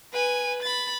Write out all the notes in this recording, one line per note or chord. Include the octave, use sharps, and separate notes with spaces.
B4 G#5
B5 A6